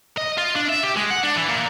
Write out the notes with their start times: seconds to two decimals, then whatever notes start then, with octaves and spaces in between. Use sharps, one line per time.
0.17 D#5
0.38 F4
0.56 D4
0.69 E5
0.83 G4
0.97 G#3
1.11 F#5
1.23 D4
1.36 E3
1.48 A#2